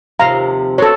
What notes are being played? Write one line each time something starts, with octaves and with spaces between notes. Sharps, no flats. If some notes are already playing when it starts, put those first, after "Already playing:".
D#2 C3 F3 F5 A#5
B3 C4 F#4 A4 C#5